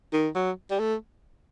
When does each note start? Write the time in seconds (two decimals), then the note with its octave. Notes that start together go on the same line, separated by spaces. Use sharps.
0.13 D#3
0.35 F#3
0.71 G3
0.79 A3